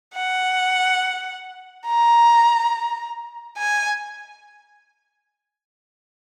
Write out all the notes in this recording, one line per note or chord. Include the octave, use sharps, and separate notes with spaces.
F#5
A#5
G#5